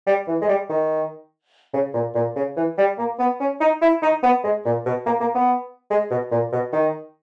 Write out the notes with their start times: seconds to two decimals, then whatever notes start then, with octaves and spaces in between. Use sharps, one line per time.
0.07 G3
0.27 E3
0.42 G#3
0.48 G3
0.69 D#3
1.73 C#3
1.94 A#2
2.15 A#2
2.36 C#3
2.56 E3
2.78 G3
2.98 A#3
3.19 B3
3.40 C#4
3.60 D#4
3.82 E4
4.02 D#4
4.23 B3
4.44 G#3
4.65 A#2
4.86 B2
5.06 A#3
5.20 A#3
5.35 B3
5.90 G#3
6.10 B2
6.31 A#2
6.52 B2
6.73 D#3